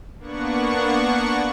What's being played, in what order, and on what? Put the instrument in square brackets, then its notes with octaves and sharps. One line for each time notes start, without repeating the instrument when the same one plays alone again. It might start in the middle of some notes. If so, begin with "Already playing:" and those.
[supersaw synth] A#3 B3 D4 F#5 C#6